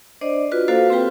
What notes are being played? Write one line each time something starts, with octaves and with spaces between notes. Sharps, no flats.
D4 C5 D5 D#5
F4 F#4 B4
A#3 F4 F#4 A4 C5 F5
C4 F4 G4 B4 G5